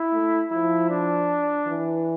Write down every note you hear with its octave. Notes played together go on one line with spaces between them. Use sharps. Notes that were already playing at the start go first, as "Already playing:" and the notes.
Already playing: E4
A3
F3 E4
D4
E3